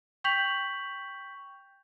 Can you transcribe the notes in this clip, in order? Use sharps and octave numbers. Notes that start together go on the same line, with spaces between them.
G5 C#6 G6 B6 F7 F#7